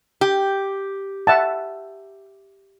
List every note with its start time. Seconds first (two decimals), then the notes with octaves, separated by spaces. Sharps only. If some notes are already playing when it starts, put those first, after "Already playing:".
0.21 G4
1.27 E5 F#5 A5